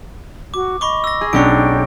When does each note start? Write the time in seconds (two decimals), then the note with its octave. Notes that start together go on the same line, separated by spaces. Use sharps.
0.54 F#4 D6
0.81 D#5 B5 C#6 D6
1.04 E6 A#6
1.21 G#4
1.33 B1 C#4 D4 C#5 G5 C#6 D7